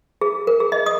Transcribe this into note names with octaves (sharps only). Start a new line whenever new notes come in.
G#4
A#4
G#4
D#5
D#6